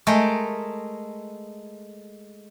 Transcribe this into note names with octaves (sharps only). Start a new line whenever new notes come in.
G#3 A3 A#4 G5